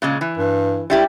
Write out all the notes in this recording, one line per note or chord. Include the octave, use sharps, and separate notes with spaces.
A#2 C#3 G#3
E3
G2
G3 E4 G4